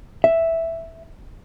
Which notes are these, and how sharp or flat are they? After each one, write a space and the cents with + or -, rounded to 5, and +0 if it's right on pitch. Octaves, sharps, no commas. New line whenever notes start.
E5 +0